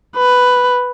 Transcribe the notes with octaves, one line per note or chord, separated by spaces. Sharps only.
B4